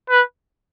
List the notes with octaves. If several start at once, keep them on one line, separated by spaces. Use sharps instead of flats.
B4